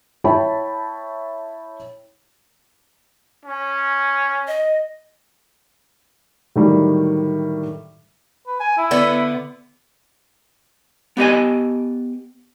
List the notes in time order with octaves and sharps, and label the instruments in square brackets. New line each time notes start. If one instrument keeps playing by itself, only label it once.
[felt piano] E4 C#5 E5 G5 A5 B5
[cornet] C#4
[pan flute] D#5
[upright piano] A2 D3 D#3 F#3 G3
[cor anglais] B4
G#5
E4
[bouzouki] D3 B3
[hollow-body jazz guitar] B3 G4 D#5 G#5